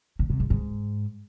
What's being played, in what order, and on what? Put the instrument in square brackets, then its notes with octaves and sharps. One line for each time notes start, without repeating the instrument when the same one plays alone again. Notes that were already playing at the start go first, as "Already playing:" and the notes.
[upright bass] A#2
C3
G#2
G#2